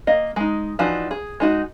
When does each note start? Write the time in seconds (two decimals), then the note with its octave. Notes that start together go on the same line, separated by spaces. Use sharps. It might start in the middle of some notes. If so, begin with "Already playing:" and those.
0.07 A#3 D#5
0.36 G#3 D#4
0.79 E3 F3 D4 D#4 F#4
1.11 G#4
1.40 G#3 D#4 F#4